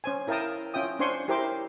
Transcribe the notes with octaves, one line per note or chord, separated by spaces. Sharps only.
C#4 C5 G#5
E4 A#4 F5 G5 A5 D#6
C#4 F4 E5 G5 D#6
C#4 D4 C5 G#5 C6 C#6
E4 G4 A#4 C5 C6 D6